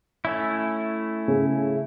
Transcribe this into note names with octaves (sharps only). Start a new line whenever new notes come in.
A3 C#4 E4
C#3